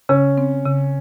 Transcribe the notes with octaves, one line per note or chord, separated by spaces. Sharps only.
C#3 C#4
C4
C#3